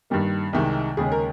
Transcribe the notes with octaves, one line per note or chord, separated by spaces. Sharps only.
G2 D#3 G3 A#3
C2 C3 D#3 G#3
D#2 C#3 G#3 G#4
A#4